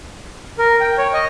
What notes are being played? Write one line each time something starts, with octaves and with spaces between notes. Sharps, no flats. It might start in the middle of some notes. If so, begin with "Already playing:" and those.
A#4
G5
C#5
D#5